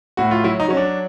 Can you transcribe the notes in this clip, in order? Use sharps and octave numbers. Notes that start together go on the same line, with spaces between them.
A2 F#4
F4
F#3 E4
D#4
F#3 C#4
D4